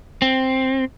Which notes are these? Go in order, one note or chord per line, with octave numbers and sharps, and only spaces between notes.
C4